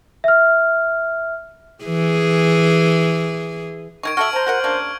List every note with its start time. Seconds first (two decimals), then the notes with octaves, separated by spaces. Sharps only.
0.24 E5 F6
1.84 E3 G#4
4.03 D#3 G3 D#4 C#6 G#6 D7
4.17 F#4 A4 E5 F6 D7 F#7
4.33 C5 A5 A#5
4.46 F#4 A#4 F#5
4.64 C#3 A#3 D4